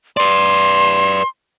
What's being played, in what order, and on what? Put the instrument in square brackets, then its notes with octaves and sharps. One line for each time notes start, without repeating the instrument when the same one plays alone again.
[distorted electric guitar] B4 D5 [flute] C6